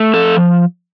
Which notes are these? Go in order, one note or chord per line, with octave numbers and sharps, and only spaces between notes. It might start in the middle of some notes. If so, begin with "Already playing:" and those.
Already playing: A3
F3 A4